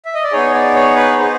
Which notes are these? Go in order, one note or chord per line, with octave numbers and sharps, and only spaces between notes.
E5
D#5
D5
B3 D#4 G#4 C#5
D5
C#5
B4
C#5
B3 D#4 G#4 C5